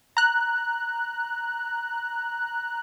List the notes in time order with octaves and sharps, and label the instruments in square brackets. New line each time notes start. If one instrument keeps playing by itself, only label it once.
[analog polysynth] A#5 F#6